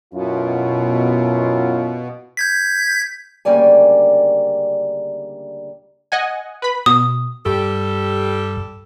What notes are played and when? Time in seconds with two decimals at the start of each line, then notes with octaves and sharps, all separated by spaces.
0.14 F#2 B2 E4 F4
2.37 G6 G#6 B6
3.45 D2 C#3 G3 A#3 D5 G#5
6.12 D#5 F#5 G#5
6.62 B4 B5
6.86 B2 D#6
7.46 G2 G3 G4 A4